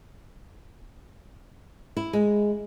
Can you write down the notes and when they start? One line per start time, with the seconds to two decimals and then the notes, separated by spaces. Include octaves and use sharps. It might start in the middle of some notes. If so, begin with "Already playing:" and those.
1.97 E4
2.13 G#3